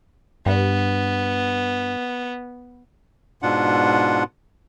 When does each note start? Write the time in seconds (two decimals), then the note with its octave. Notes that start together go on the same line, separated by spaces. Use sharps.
0.46 G2 B3
3.42 G#2 B2 D4 F4 F#5